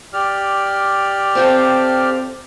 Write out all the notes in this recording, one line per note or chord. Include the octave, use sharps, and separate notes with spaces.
G4 D5 F6
C4 F4 A4